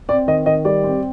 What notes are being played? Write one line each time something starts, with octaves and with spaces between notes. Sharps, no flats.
C4 D5
D#3 D#5
D#3 D#5
G3 D5
C4